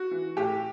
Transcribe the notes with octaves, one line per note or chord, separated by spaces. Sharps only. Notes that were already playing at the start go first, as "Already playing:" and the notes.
Already playing: F#4
E3
A2 G4